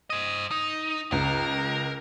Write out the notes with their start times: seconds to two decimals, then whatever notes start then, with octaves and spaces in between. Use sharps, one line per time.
0.10 C5 D#5
0.51 D#4
1.12 C#2 A#4